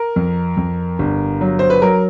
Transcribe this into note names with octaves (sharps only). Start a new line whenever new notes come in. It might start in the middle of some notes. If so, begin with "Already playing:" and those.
Already playing: A#4
F2
F2
G1
F#3
C5
B4
F#3 A#4